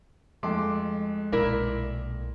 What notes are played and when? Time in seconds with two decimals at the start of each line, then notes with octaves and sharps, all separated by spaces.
0.43 F2 G#3 A3 C6 D6
1.32 B1 A#2 E4 A#4 D5